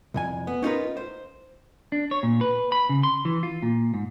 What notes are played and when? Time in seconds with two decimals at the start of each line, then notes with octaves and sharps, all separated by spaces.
0.14 C2 F2 G#5
0.47 B3
0.62 C#4 D#4 F4 A#4 B4
0.97 C5
1.92 D4
2.11 C#5
2.23 A#2
2.41 B4
2.72 B5
2.89 C#3
3.03 C6
3.25 E3
3.43 F4
3.62 A#2
3.94 G#2